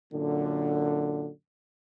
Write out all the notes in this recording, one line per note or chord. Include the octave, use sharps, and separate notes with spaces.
F#2 A#2 D3